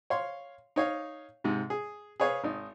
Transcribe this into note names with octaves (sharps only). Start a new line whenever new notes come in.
C#5 F5 C6
D#4 C#5 F5
G#2 C3
G#4
G#4 B4 C#5 F5
G#1 D#4